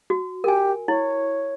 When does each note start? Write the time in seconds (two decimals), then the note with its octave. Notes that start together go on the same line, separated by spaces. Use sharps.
0.10 F#4
0.44 G4 A#4 G#5
0.88 E4 C#5